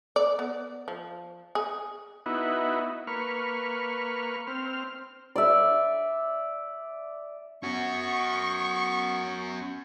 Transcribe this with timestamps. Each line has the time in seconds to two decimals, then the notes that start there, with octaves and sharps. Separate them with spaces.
0.16 D5
0.39 B3
0.88 F3
1.55 G#4
2.26 B3 D#4 E4 F#4
3.07 A#3 B4 C#6 F6
4.47 C4 F6
5.35 D5 E5
7.63 B3 C#4 F#4 C#6